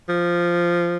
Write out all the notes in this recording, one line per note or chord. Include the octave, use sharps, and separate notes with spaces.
F3